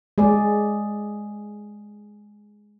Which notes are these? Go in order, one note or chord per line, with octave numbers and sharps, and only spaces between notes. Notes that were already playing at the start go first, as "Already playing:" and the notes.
G#3 G#4 D5